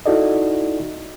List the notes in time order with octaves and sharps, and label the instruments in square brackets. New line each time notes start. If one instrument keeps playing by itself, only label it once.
[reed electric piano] D#4 E4 F#4 A4 D5 D#5